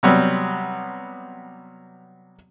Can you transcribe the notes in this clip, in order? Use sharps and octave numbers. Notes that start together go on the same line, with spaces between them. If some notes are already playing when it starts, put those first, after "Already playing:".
C3 F#3 G3 B3